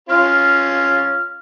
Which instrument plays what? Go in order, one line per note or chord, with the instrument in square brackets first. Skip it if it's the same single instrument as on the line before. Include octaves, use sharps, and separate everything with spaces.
[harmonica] C#4 F4 [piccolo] F6